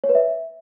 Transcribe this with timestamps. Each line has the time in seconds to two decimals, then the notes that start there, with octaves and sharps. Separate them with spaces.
0.04 C#5
0.09 B4
0.15 E5